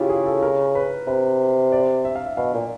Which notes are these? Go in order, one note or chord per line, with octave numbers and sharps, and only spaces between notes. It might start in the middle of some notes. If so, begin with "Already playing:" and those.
Already playing: C#3 E4 F4 G4
G#4
A4
A#4
B4
C3 B4
D5
E5
F5
E5
B2 F5
A#2